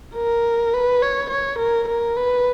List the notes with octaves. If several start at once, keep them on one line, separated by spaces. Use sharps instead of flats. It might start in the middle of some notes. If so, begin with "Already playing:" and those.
A#4
B4
C#5
C#5
A#4
A#4
B4